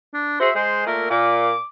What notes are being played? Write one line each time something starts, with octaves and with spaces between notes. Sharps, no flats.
D4
F#4 G#4 C5 E5
G#3 C5
A#2 A3 A#4
A#2 D6